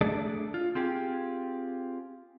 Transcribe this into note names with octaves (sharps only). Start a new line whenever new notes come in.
A3 D4 G#4 A4 D5
F4
C4 F4 G4 G#4